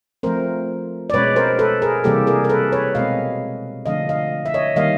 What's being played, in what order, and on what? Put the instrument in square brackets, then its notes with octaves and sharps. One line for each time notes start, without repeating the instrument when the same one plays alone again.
[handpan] F3 A3 C4 A#4 C5
D5
B2 G#3 C#4 B4 C#5
A#4 C5
A4 B4
G#4 A#4
C3 E3 G3 A#3 G4 A4
G#4 A#4
A#4
A4 B4
B4 C#5
B2 G#3 C4 D#5 F5
D3 F3 A3 D4 D#5 F5
D#5 F5
E5
C#5 D#5
D#3 G3 A#3 D#5 F5